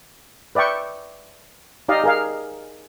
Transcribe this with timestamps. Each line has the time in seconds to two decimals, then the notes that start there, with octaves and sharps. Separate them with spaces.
0.55 B4 D5 E5 G5 C#6
1.89 D#4 G4 D5 D#5 F5
2.04 G#4 A#4 F5